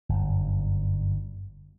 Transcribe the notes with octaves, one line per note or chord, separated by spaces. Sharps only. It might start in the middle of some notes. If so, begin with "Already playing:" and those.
G1 F#2